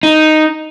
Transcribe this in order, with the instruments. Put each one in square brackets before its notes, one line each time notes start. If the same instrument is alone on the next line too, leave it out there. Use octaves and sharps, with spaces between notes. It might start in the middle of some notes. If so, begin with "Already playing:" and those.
[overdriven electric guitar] D#4